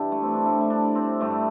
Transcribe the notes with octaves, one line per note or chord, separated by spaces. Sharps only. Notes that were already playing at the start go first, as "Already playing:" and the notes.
Already playing: G2 E3 G3 D4 E4 G4
A3
C4
D4
A2 G3 E4
E4
D4
C4
G2 D3 G3 A3